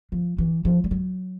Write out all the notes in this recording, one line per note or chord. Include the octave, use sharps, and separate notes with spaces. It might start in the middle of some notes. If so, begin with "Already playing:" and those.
F3
E3
F3
G3
F#3